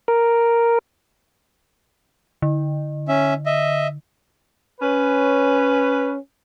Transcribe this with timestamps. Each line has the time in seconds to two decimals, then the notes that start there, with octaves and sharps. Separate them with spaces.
0.08 A#4
2.42 D3
3.08 C#4 E5
3.46 D#5 E5
4.81 C#4 B4